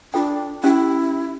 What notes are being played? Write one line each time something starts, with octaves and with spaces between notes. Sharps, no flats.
D4 F4 A4 G5
C#4 E4 G4 G5